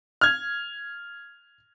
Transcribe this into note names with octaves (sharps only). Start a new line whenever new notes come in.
F6 G#6